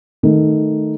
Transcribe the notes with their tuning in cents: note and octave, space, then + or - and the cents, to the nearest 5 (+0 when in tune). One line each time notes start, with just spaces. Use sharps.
D#3 +0 A3 +0